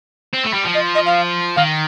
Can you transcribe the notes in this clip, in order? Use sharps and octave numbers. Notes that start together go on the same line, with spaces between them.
C4
A3
G3
F3
D#5
D#5
F5
D#3 F5